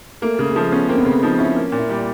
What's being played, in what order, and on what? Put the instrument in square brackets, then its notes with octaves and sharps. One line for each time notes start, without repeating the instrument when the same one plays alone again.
[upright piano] A3 [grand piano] A#3
[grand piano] C#3 [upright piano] A3
[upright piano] G#3
[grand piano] F3 [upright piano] A3
[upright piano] B3 [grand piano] C#4
[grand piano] A#3 [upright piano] C4
[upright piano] B3
[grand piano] C#3 [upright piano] C4
[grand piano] F3 [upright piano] D#4
[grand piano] C#4 [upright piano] E4
[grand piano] A#3
A#2
[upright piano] E4
[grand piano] G3